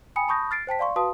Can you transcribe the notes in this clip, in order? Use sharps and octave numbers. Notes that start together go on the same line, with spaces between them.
G5 G#5 B5 D#6 C#7
A5 B5 C#6 D#6 G6 A#6
F6 A6 C7 D7
C5 G5 A5 B6
D5 F5 C6 C#6
F#4 B4 F5 A5 C6 D#6